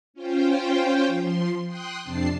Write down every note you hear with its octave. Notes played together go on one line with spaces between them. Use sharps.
C#4 F4 C5 G5
F3 C6
G5 C6 D#6 F#6
F2 C3 D4 A5 C7